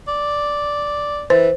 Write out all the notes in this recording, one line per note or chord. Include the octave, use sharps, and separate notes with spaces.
D5
E3 C5